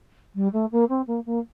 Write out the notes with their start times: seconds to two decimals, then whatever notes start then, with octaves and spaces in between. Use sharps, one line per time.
0.35 G3
0.53 A3
0.72 A#3
0.89 C4
1.07 A#3
1.26 A#3